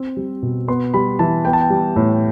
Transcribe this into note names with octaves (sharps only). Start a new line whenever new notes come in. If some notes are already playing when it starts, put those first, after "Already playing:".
Already playing: C4
G3
B2
B3 C6
G3 B5
E3 A5
B3 G5
A5
G5
G3
A2